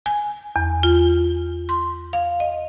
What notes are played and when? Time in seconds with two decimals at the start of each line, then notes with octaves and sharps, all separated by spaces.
0.06 G#5
0.56 E2
0.83 F4
1.69 C6
2.13 F5
2.40 D#5